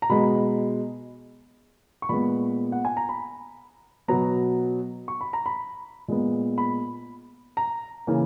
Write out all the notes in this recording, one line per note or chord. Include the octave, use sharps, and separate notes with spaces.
A#5
B2 G#3 B3 B5
C#6
A#2 G#3 B3 B5
F#5
G#5
A#5
B5
B2 F#3 B3 A#5
C#6
B5
A#5
B5
A#2 G#3 B3
B5
A#5
C#3 E3 A#3